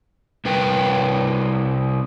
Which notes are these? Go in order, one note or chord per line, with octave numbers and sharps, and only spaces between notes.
C3 G3 A#4 B4 G5